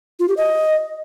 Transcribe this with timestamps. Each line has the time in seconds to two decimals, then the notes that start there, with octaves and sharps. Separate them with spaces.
0.20 F4
0.28 G4
0.37 D#5